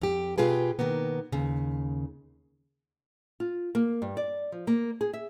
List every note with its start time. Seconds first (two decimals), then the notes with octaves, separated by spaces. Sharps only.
0.01 F2 G4
0.38 B2 F4 G4 G#4 B4
0.79 B2 D#3 A#3 B3
1.32 D#2 C#3
3.40 F4
3.75 A#3
4.02 G2
4.17 D5
4.52 F3
4.67 A#3
5.01 G#4
5.13 E5